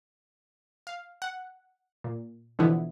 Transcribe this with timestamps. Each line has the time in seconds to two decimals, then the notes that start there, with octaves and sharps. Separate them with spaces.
0.87 F5
1.22 F#5
2.04 A#2
2.59 B2 D3 E3 F3 B3 E4